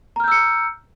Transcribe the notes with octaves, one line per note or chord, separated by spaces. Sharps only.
A#5 E6 F6 G6 C#7